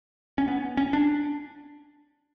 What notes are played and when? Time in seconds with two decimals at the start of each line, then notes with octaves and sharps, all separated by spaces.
0.38 C#4
0.48 B3
0.77 C#4
0.93 D4